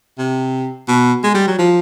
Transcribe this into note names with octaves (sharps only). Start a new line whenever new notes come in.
C3
B2
G#3
G3
F#3
F3